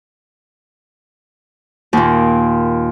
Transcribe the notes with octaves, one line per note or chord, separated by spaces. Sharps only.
D#2 A#2